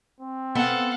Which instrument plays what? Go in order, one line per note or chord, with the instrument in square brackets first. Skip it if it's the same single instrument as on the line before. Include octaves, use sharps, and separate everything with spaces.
[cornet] C4
[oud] B3 [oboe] A4 [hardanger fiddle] F5 F#5